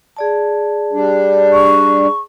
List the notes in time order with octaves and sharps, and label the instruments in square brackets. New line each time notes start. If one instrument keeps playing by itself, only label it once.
[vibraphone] G#4 D5 A5
[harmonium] G3 D4
[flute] C#6